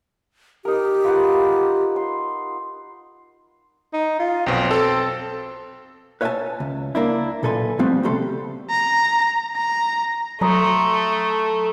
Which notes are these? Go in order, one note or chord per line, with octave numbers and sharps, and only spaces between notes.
D#4 G4 A#4
F4 B4 F#5
C6
D#4
F4
B1 F2 B2 C4
A4
B4 C#5 E5 F5 G#5 A5
C#2
A#3 D4 E4
B1 A#2 A4 B4 G#5 C6
F3 G3 A3 B3 C4 B4
C2 C#3 A3 G4 A4 C6
A#5
A#5
F#3 A3 A#5 C6 D#6